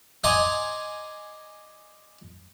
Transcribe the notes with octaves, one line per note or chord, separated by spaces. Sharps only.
D5 D#5 F#5 G#5 A#5 C6